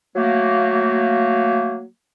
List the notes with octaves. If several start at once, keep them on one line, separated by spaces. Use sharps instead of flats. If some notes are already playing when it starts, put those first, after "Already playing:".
F#3 A3 A#3